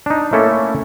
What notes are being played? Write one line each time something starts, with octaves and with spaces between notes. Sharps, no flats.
D4 D#4
A3 A#3 C#4 E4 A4